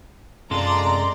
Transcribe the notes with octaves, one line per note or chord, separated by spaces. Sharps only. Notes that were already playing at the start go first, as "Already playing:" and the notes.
F#2 C3 G#3 F4 A4 D5 A#5 C6